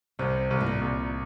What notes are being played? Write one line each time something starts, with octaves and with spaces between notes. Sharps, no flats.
C2 C3
C2
A2
A#2
C2